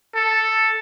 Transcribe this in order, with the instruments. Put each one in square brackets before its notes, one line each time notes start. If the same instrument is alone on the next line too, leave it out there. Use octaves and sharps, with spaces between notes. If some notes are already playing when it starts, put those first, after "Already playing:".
[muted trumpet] A4